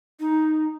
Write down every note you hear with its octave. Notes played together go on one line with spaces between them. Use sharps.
D#4